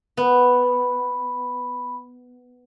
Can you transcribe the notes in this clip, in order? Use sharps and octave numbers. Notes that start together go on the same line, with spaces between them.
B3 B5